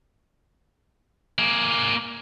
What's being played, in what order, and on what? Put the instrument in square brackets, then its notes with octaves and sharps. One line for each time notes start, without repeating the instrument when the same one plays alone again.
[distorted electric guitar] A#3 G#4